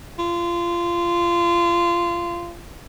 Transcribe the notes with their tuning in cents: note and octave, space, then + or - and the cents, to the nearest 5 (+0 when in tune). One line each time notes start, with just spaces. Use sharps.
F4 -20